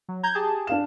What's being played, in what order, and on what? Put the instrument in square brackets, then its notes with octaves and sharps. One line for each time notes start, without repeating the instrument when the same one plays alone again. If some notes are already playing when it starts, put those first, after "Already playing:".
[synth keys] F#3
A#5 G6 G#6
G4 G#4 A5
[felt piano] D4 F5 E7